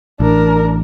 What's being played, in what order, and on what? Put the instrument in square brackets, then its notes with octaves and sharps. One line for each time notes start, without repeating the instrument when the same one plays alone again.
[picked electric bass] A1 [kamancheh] D4 A#4